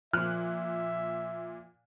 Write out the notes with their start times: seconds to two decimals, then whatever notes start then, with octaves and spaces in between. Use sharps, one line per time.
0.13 A#2 F3 E5 F6 F#6